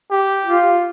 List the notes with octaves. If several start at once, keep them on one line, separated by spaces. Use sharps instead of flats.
G4
F4